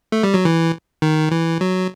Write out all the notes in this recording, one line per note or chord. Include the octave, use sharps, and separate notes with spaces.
A3
G3
F#3
E3
D#3
E3
F#3